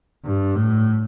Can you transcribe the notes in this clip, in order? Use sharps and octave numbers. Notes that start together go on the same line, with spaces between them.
G2
A2